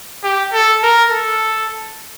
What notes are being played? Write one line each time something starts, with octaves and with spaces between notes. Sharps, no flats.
G4
A4
A#4
A4